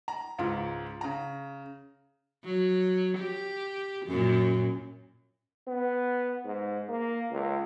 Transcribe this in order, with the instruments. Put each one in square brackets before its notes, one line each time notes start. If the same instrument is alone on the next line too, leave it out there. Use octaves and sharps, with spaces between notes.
[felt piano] A#5
C#2 G#2 F4
C#3 A#5
[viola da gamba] F#3
G4
F#2 A#2
[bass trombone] B3
G#2
A#3
C#2